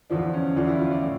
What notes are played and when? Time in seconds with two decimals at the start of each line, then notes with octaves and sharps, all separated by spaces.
0.10 E2 D3 F3 D4
0.34 C#4
0.56 E2 D3 F3 D4
0.67 E4
0.79 F4
0.91 D5
1.03 A2